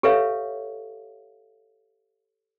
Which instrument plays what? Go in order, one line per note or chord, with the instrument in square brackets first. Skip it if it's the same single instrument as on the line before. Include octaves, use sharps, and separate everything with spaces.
[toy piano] G4 A4 B4 C#5 E5 F5